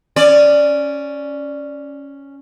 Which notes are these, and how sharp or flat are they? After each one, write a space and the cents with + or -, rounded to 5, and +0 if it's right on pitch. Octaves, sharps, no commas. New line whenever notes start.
C#4 +0 D5 +0